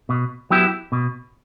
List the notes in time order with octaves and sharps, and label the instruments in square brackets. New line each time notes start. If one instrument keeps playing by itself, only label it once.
[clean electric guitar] B2
F#3 B3 E4 G4
B2